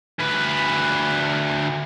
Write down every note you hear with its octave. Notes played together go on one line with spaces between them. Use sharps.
D2 B4